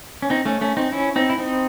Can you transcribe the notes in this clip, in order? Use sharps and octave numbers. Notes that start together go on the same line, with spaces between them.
C#4
C4 D#4
A3 C#4
A3 C#4
C4 D#4
C#4 E4
C4 D#4
E4
C4 D#4